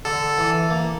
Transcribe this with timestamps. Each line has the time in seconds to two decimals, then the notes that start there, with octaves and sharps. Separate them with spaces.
0.05 D3 A4
0.38 E3
0.70 A#3